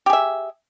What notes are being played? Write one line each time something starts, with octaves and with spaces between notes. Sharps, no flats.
G4 G#4 E5